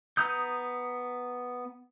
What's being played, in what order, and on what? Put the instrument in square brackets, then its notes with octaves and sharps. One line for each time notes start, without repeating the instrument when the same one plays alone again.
[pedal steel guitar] B3 A#5 D#6 G6